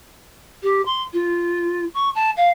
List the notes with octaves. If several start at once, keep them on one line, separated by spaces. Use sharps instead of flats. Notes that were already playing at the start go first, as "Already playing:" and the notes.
G4
C6
F4
C#6
A5
F5